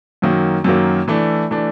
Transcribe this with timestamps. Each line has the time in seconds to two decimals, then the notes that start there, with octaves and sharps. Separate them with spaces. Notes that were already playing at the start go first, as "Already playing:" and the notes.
0.22 F#2 D#3 F#3 A#3
0.64 F#2 D#3 F#3 A#3
1.08 E3 A3 D4
1.51 E3 A3 D4